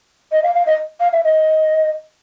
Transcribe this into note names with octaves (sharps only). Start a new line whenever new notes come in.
D#5
F5
F5
D#5
F5
E5
D#5